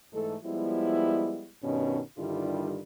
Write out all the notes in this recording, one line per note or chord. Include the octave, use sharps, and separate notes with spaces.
G#2 E3 G#3 A3 A4
F3 G3 G#3 B3 E4
G2 B2 D#3 C#4
G2 D3 D#3 G3 E4 F4